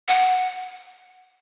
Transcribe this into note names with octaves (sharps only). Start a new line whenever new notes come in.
F#5